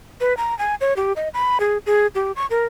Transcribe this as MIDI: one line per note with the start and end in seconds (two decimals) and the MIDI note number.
0.20 0.36 71
0.37 0.57 82
0.59 0.75 80
0.81 0.93 73
0.96 1.13 67
1.16 1.28 75
1.34 1.58 83
1.60 1.78 68
1.86 2.07 68
2.15 2.32 67
2.36 2.46 85
2.50 2.65 70